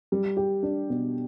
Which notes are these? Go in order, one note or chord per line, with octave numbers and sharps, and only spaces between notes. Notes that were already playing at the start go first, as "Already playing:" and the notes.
G3
G4
D4
B2